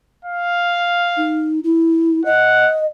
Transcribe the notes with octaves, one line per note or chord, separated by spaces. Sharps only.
F5
D#4
E4
D#5 F#5